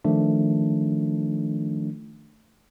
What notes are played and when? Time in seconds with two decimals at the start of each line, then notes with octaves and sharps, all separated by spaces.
0.05 D#3 F3 A3 D4